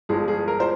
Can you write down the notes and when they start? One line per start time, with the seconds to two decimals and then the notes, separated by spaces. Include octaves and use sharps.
0.09 G1 G2 F3 G#3 G#4
0.28 G#4
0.48 A#4
0.60 C5